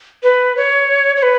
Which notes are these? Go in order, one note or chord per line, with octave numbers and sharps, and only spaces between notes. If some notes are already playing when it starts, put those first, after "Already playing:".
B4
C#5
C#5
B4